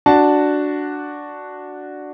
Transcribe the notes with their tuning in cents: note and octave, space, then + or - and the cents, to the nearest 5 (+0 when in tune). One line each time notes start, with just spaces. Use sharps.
D4 +0 F#4 +0 A5 +0